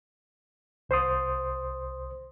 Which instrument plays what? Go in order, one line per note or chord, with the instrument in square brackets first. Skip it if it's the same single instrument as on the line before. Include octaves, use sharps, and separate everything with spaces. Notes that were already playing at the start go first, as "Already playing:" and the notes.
[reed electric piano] C2 C5 C6 D#6